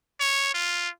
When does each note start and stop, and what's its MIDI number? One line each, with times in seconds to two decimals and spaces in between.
0.20 0.54 73
0.54 0.89 65